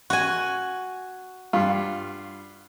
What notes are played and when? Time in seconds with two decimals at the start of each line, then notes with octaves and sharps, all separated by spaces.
0.10 F#4 G#5
1.53 G2 F4